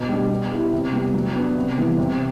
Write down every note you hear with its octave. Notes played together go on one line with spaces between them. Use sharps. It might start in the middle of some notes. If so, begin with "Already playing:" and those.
Already playing: B2
G3 D4 G4
B3
E4 G4
C3
G3 B3
F#3
B3 D4
C3
E3 G3 B3
C3